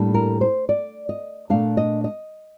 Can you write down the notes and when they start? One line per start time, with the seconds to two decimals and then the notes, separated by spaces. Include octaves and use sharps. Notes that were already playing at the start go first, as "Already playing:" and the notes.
Already playing: A2 G3 A#3 D4
0.14 A#4
0.41 C5
0.69 D5
1.09 D#5
1.50 A#2 A3 D4 F5
1.77 D#5
2.04 D#5